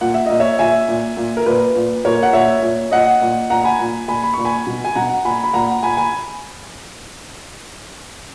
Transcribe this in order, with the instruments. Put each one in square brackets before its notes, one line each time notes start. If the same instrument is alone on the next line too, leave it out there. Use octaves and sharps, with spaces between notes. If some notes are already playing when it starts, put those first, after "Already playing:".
[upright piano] A#2 F#5
E5
A#2 D#5
C#5 E5
A#2 E5 G#5
A#2
A#2
A#4
A#2 B4
A#2
A#2 A#4 C#5
F#5
A#2 C#5 E5
A#2
A#2 D#5 F#5
A#2
A#2 F#5 A#5
G#5 B5
A#2
A#2 G#5 B5
B5
A#2 C#6
G#5 B5
B2
G#5
B2 F#5 A#5
A#2 G#5 B5
B5
A#2 F#5 A#5
A#2 G#5 B5
G#5 B5